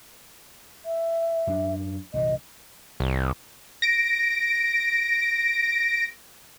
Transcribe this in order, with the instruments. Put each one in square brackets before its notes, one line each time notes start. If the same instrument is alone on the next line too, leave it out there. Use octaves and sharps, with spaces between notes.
[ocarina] E5
[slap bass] F#2 D4
[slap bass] C2 A#2 E3 [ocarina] D#5
[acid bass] C2
[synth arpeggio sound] A#6 D7